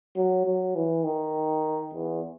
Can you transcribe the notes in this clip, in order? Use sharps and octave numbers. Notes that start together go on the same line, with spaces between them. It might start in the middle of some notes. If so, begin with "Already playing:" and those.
F#3
F#3
E3
D#3
E2